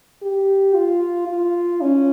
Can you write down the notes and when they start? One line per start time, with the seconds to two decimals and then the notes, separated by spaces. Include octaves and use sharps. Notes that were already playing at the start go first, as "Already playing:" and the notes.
0.22 G4
0.75 F4
1.28 F4
1.81 C#4